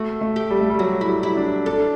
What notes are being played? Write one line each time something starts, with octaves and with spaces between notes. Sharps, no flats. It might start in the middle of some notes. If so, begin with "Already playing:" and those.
Already playing: A3 F#4
A3
G4
G3
A3
G3
F#3 F#4
E4
G3
E4
D4
D4 A4